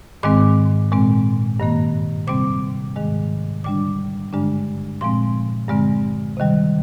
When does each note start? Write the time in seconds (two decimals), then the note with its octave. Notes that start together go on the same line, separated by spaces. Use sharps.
0.23 G#2 D#3 G#3 C4 D6
0.92 A#2 G#3 C4
1.60 G2 D#3 A#3
2.27 C3 G3 C4 D6
2.96 G#2 D#3 G#3
3.64 D3 G3 D4 D6
4.33 G2 D3 G#3 D4
5.01 A#2 F3 G#3 C4 C6
5.69 G2 D3 G#3 C4
6.37 C3 D#3 G3